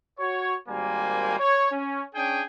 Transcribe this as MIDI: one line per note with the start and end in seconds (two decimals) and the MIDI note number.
0.18 0.53 66
0.18 0.53 73
0.68 1.37 32
0.68 1.37 55
0.68 1.37 58
0.68 1.37 72
0.68 1.37 80
1.39 1.69 73
1.71 2.02 61
2.14 2.41 61
2.14 2.41 62
2.14 2.41 68
2.14 2.41 79